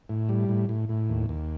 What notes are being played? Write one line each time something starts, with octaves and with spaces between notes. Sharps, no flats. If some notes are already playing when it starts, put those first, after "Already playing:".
A2
G3
A2
A2
A2
D#2
D#2